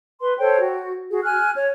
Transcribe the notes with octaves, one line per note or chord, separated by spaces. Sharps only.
B4 C6
A4 C5 C#5 G5
F#4
F#4 G#4
G#5 F6 F#6
C#5